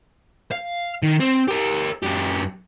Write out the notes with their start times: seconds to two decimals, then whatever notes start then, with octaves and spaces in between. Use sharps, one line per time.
0.52 F5
1.03 D#3
1.20 C4
1.48 G4 A#4
2.03 F#2 G4